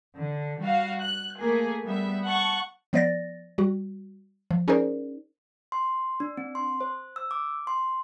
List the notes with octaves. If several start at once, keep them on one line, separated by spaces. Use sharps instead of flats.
D3
G3 F#4 F5
F#6
A3 A#3 G#4
G3 B3 E5
F#5 A5 C#6
F3 B3 C5 D5 A6 A#6
G3 F#4
F3
C#4 D#4 G#4 A#4 C5 D5
C6
D4
C4
C6
C5
E6
D6
C6